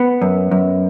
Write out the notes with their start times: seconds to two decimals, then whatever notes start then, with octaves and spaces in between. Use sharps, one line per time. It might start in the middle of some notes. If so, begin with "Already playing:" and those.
Already playing: B3
0.22 F#2
0.51 F#2